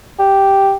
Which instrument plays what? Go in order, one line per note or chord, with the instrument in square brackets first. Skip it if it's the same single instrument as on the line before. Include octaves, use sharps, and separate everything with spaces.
[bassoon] G4